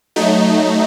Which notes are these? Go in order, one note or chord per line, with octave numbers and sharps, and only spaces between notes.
F#3 A3 D#4